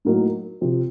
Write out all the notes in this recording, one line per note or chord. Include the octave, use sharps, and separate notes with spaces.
A2 F#3 A#3 D#4
C3 F3 C4